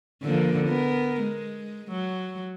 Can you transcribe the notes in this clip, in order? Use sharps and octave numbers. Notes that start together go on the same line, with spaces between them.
D3 F3 A#3
B3 A#4
G#3
F#3